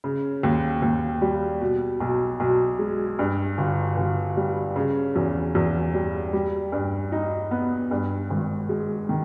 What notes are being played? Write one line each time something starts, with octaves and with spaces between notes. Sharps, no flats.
C#3
D#2
D#2
G3
B2
B1
B1
G#3
G2
G1
G1
G3
C#3
E2
E2
G3
G3
G2
D#4
B3
G2
G#1
G#3
D#3